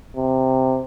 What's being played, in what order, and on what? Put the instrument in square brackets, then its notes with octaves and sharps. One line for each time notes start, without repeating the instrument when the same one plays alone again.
[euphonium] C3